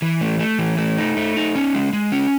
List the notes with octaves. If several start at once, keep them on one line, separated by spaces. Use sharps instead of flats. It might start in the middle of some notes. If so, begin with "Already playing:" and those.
E3
A3
A3
E3
A3
D#4
A3
D#4
C#4
G#3
G#3
C#4